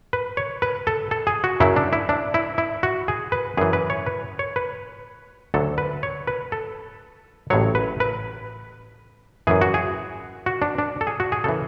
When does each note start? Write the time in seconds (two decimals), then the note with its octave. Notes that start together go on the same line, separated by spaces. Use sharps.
0.13 B4
0.37 C#5
0.62 B4
0.87 A4
1.11 A4
1.27 G#4
1.44 F#4
1.60 F#2 C#3 F#3 E4
1.76 D4
1.93 E4
2.09 D4
2.34 E4
2.58 E4
2.83 F#4
3.08 G#4
3.32 B4
3.57 F#2 E3 G#4
3.73 B4
3.90 C#5
4.06 B4
4.39 C#5
4.56 B4
5.54 D2 D3 F#3 A4
5.78 B4
6.03 C#5
6.27 B4
6.52 A4
7.50 A1 A2 F#3 C#5
7.75 B4
8.00 B4
9.47 F#2 E3 G#4
9.61 F#4
9.74 G#4
10.46 F#4
10.62 D4
10.78 D4
11.01 A4
11.07 G#4
11.20 F#4
11.32 G#4
11.44 C#3 E3 A4